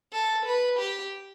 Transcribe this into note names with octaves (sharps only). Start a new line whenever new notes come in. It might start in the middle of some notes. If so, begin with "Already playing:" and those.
A4
B4
G4